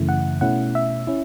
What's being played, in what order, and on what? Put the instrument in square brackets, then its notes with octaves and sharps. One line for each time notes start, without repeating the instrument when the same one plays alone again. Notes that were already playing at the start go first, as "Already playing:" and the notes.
Already playing: [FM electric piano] F#2 C#3 E3 A3 E4
F#5
B2 A3 C#4 E4 F#5
E5
C#4 E4